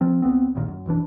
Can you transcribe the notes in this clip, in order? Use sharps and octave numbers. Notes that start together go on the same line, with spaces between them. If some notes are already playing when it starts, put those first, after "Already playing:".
F3 C4
C#2 B3 C4
A#1 D#2 A#2 D#3
F#2
E1 B1 E3 D4